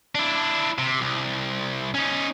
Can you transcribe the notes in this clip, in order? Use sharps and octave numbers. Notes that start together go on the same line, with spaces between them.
D4 E4
C3
C2
C#4 D#4